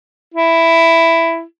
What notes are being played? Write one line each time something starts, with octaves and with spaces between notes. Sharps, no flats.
E4